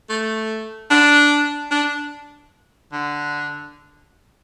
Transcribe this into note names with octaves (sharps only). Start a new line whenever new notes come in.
A3
D4
D4
D3